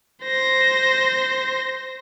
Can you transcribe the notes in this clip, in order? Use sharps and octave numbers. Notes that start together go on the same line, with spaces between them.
C5 A#6